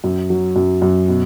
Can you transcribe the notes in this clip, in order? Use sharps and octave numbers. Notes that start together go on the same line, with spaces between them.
F#2
F#3
F#2
F#2
B2